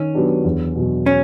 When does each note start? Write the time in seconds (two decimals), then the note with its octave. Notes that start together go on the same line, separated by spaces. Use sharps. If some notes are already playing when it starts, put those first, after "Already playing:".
Already playing: D#3 C#4
0.14 F#3 B3 D4 G4
0.44 E2
0.75 B2 F#3
1.06 C#4